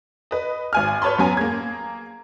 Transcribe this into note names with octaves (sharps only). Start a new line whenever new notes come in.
B4 D#5
G#1 G#5 F6
B4 C#5 A5 B5 C6
F#2 B3 G#5 A#5
A#3 G#4 G#6